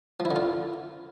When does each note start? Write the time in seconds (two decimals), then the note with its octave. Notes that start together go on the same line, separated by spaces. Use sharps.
0.20 F3
0.25 E4
0.31 D3
0.36 F4